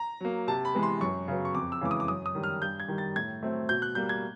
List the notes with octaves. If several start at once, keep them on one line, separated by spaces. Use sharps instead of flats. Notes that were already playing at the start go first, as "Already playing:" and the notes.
Already playing: A#5
F#3 A#3
C3 A5
B5
E3 G#3 B3
C6
F#2 C#6
C#3 F#3 B3
C#6
F2 D6
E6
C#3 E3 G#3 D6
D#6
D6
F#2 D#6
D#6
D#3 G3
F6
G2 G6
G#6
D#3 G3
A6
A2 G#6
F#3 A3 C4
B2 G6
F#6
G3 A#3 G6
G#6